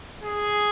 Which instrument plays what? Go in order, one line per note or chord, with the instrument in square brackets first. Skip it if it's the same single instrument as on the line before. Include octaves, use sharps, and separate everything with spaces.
[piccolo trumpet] G#4